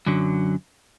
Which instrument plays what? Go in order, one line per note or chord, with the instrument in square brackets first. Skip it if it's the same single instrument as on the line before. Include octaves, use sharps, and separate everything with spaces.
[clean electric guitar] F#2 D3 F#3